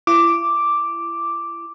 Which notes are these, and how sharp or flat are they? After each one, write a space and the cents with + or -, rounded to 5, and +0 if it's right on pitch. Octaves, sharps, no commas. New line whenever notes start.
E4 +40 D6 +0